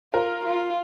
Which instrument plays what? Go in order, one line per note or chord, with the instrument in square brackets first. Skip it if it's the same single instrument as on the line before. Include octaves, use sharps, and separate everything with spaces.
[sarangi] F4 [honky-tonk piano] A#4
[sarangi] F4